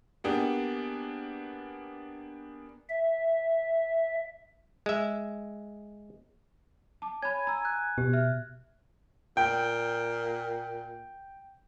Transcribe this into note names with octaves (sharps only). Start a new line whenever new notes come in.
A#3 B3 D4 G4 G#4
E5
G#3 E5
A5 D6
C#5 G#5 B5 G#6
A#5 E6
F#6
B2 G4
E5 F6
A#2 G5